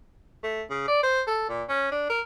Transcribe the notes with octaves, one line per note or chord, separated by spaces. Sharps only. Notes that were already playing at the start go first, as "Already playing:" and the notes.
A3
C#3
D5
C5
A4
A#2
C#4
D4
A#4